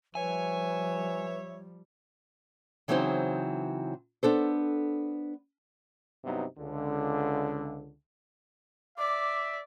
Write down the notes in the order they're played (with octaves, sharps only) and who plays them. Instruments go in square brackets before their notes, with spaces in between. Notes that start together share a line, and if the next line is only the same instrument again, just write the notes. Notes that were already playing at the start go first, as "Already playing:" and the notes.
[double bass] F3 G3 [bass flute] B4 [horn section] C#5 E5 [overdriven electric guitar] G#5
[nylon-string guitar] C#3 E3 F#3 C4 D#4 C5
B3 D4 A4 C5
[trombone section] G2 C3 F#3 B3 D#4
C#2 D3
[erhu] D5 [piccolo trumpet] E5 [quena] D6